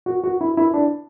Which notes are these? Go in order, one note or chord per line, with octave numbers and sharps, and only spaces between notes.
F#4
F#4
E4
E4
D4